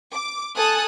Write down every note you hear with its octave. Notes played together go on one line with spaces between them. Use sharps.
D6
A4 G#5 A5 D#6 F#6 A6